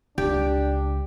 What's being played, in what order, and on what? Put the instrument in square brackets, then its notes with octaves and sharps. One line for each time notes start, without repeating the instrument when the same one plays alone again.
[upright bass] C#2 [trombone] D4 [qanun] G4